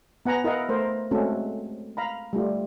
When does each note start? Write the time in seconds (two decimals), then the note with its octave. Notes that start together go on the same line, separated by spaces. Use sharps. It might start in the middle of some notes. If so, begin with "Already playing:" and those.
0.26 B3 F#5 G#5 A#5
0.44 E4 A#4 D#5 F5 F#5
0.69 A3 A#4 C5
1.11 G#3 A3 C4 C#4 F#4 A4
1.97 F5 A#5 B5
2.33 G3 A3 F4